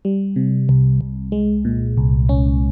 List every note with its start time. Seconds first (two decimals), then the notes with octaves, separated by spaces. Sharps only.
0.05 G3
0.36 C3
0.69 C2
1.01 C2
1.32 G#3
1.65 A#2
1.97 C2
2.29 C#4